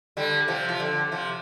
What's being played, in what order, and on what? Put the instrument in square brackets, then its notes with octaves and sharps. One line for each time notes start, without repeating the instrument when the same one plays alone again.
[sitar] D3 G3
C3 F3
F3
D3
C3 F3